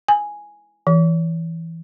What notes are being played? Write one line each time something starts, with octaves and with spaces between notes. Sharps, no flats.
G#5
E3